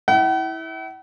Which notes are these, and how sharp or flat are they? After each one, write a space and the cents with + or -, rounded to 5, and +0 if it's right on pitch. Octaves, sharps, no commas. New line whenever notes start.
E4 -20 F#5 +45